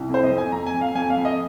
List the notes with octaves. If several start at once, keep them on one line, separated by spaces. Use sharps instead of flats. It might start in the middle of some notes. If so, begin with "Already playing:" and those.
Already playing: C2
F2
C5
D#5
F2
G#5
F2 A#5
G#5
F2
F5
F2 G#5
F5
F2
D#5